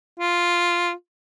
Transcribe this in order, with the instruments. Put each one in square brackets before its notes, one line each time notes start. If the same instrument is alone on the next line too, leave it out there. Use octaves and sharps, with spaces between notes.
[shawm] F4